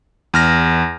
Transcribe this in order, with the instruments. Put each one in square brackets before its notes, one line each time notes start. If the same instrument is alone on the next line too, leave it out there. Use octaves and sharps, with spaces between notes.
[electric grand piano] E2 F6 A#6